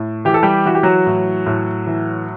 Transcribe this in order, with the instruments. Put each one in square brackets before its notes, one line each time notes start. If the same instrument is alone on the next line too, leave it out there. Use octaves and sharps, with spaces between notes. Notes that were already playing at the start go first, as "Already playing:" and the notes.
Already playing: [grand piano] A2
E3 G4
A4
G3 G4
E3 F#4
G4
F#3 F#4
A2
A2
E3